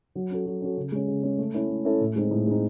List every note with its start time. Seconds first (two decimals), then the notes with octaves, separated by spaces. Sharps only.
0.15 F#3
0.30 C#4 F#4 A4
0.46 F#3
0.61 C#4 F#4 A4
0.77 C#3
0.92 G#3 C#4
1.08 C#3
1.23 G#3 C#4
1.39 A3
1.54 C#4 E4 A4
1.70 A3
1.85 C#4 E4 A4
2.01 A2
2.16 G#3 C4 D#4
2.31 A2
2.47 G#3 C4 D#4